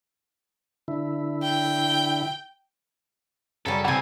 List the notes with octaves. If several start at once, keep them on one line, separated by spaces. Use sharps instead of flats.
D3 E4
G5
F#2 C#3 F#3 G3 A4
C3 E3 C4 F#5 G#5 A5